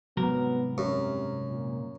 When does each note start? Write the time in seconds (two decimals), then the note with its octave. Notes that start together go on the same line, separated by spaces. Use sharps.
0.17 C2 G#2 F#3 B3 A#4
0.78 F#2 C3
1.48 A#2